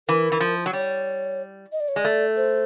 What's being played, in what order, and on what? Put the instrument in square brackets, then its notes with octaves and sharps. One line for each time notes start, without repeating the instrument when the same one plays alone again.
[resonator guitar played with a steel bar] E3 [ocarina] A#4
[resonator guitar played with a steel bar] E3
F3
F#3
[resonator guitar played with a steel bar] G3 [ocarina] C#5
[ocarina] D#5
D5
C#5
[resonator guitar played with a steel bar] G#3 [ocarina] D5
[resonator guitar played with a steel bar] A3
[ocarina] C5